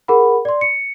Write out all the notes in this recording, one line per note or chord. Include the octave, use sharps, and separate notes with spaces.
G#4 A#4 F#5 B5
D5 C6
C#7